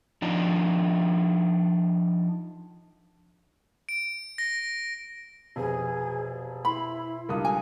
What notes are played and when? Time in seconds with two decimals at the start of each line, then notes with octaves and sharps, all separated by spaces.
0.22 F3 D4 D#4
3.89 D7
4.38 A#6
5.56 F1 B2 G#4 B4
6.65 E4 B5 C6
7.29 C#2 G2 F4 A4 A#4 D#6
7.45 G#5